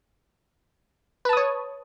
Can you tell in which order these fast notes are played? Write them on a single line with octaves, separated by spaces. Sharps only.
B4 A5 D#6 C#5